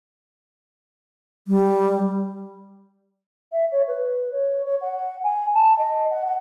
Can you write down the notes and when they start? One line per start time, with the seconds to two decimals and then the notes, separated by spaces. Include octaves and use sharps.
1.48 G3
3.52 E5
3.71 C#5
3.87 B4
4.32 C#5
4.65 C#5
4.81 F#5
5.23 G#5
5.54 A5
5.78 D#5
6.10 F#5
6.25 F#5